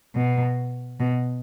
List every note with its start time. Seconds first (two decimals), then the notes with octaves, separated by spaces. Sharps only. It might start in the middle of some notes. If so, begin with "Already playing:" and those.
0.15 B2
1.00 B2